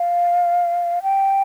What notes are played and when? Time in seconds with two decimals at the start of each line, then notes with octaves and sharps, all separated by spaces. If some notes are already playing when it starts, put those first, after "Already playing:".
Already playing: F5
1.03 G5